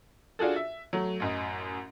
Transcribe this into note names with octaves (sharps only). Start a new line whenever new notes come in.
D4 F4 F#4 G#4 A4
E5
F#3 A3
A1 F#2 D#5